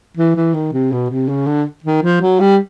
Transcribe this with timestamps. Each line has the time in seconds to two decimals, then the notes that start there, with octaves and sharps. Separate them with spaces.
0.17 E3
0.36 E3
0.54 D#3
0.73 C3
0.92 B2
1.10 C3
1.29 C#3
1.47 D3
1.84 D#3
2.03 F3
2.22 F#3
2.40 G3